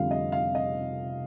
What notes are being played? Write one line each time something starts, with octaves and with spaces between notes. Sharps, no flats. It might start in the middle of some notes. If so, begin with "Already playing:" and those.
Already playing: F1 F2 D3 G3 F5
D#5
F5
D#5